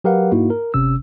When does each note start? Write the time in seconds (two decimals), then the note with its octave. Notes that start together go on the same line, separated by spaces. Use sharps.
0.04 F#3 G4 A#4 B4 F5 F#5
0.32 G#2 A#3 D#4 E4 F#4
0.50 A#4
0.74 G1 C3 C#4 E6